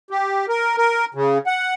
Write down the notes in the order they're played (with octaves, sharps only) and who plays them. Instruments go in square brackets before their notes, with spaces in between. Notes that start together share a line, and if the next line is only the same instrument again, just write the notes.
[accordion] G4
A#4
A#4
C#3
F#5